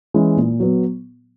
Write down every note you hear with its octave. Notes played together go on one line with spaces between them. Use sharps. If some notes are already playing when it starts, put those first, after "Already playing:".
E3 G#3 C#4 E4
A#2
F#3 B3